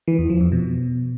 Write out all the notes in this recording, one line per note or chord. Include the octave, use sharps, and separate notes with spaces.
E3
E2
F3
F2
B2